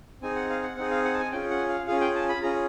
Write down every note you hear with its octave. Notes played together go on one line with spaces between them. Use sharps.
C4 D#4 G#4 G#5
F#5
F5
F#5
C4 D#4 G#4 F#5
F5
F#5
A5
G#5
C#4 F4 G#4 G5
F#5
F5
C#4 F4 G#4 F5
G5
A5
B5
C#4 F4 G#4 A#5